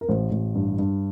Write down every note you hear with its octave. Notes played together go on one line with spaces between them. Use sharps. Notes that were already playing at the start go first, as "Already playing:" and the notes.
A#4
A1 C5
A1
G2
G2